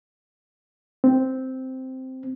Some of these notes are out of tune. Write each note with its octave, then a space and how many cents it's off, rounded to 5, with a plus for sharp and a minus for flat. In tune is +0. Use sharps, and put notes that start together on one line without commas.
C4 -5